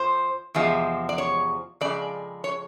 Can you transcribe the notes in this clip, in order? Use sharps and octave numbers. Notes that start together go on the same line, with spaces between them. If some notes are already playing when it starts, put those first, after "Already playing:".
Already playing: F2 F3 C5
E2 C3 F3 G#3
D5
C#5
F2 C#3 G#3 D5
C#5